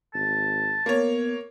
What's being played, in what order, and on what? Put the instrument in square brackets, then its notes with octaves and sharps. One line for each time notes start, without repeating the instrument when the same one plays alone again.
[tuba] G#1 [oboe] A5
[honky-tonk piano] A#3 C#5 [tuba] B3